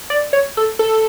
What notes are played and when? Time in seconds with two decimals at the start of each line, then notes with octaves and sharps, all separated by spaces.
0.10 D5
0.33 C#5
0.57 A4
0.79 A4